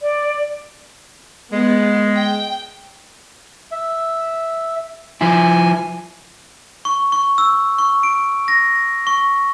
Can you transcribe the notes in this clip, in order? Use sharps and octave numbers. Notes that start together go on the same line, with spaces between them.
D5
G#3 B3
G5
E5
F3 E4 G#5
C#6
C#6
E6
C#6
D7
A#6
C#6